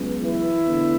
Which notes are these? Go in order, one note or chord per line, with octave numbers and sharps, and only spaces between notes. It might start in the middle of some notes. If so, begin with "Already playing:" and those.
Already playing: C#2 C#3 F#3 B3
E3 E4
E2 D3 A3